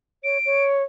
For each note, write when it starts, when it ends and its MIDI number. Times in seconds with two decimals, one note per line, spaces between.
0.24 0.38 73
0.24 0.65 98
0.46 0.83 73